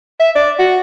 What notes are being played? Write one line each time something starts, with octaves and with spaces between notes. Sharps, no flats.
E5
D5
F#4